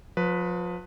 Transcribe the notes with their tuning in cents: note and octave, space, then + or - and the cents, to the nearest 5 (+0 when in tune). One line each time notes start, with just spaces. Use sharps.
F3 +35 B4 +0